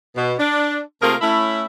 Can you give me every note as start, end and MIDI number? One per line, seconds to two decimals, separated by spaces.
0.16 0.33 47
0.38 0.79 62
1.01 1.15 48
1.01 1.15 57
1.01 1.15 58
1.01 1.15 65
1.01 1.15 68
1.01 1.15 70
1.21 1.64 57
1.21 1.64 61
1.21 1.64 64